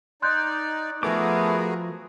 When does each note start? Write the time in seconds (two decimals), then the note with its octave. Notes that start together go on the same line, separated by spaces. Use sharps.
0.22 D#4 D5 C6 F#6 G6
1.03 F3 A3 B3 F#4 G#4 A#4 D6